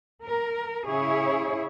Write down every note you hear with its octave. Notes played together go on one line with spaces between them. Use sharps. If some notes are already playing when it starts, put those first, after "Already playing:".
A#4
C#3 E4 G#4 C#5